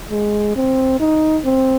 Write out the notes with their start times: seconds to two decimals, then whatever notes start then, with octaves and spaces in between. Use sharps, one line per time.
0.11 G#3
0.56 C4
1.00 D#4
1.45 C4